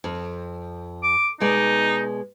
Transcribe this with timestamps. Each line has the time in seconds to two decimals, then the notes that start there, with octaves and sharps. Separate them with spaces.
0.04 F2
1.03 D6
1.40 B2 G#3 D#4 D5